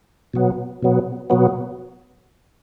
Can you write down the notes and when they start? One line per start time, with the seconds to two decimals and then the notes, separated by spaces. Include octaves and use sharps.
0.34 B2 F#3 B3
0.82 B2 F#3 B3
1.30 B2 F#3 B3